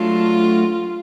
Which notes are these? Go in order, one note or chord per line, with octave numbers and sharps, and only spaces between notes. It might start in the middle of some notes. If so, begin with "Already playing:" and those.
Already playing: F#3 A3 D4 F4 F#4 A4